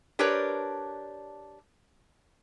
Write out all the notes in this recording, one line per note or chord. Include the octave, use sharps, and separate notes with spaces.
D4 G4 A#4 B4 C#5 D5